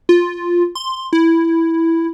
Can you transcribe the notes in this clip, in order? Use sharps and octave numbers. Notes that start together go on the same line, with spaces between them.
F4
C6
E4